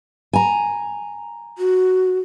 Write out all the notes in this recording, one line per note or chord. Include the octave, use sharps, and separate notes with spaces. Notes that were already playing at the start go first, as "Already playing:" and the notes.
G#5 A#5
F#4